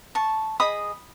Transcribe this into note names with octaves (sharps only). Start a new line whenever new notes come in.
A5 C#6
G#4 D#5 B5 D#6